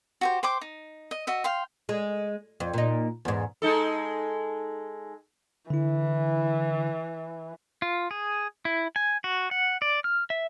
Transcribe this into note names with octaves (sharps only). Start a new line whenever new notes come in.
F#4 G4 C5
C5 G5 C6 D6
D#4
D#5
F#4 D#5 E5
F5 G5 C6
G#3
F2
A#2 D#4
E2 G#2
G#3 D#4 A4
D3 E3 E4
F4
G#4
E4
G#5
F#4
F#5
D5
F6
E5